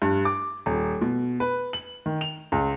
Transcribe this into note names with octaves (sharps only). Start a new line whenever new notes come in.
G2
D6
D#1
B2
B4
F#7
D#3
F7
C#2